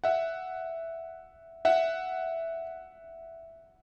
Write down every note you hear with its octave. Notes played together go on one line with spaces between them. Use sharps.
E5 F#5
E5 F#5